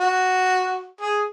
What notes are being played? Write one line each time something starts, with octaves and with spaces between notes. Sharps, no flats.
F#4
G#4